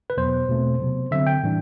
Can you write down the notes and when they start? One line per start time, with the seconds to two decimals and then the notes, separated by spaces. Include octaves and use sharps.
0.10 B4
0.17 E2 B2 F#3 B3 C5
0.48 E2 B2 A3 C4
0.80 C3 F#3 B3
1.11 D3 F#3 C4 E5
1.27 G5
1.43 A2 E3 G3 D4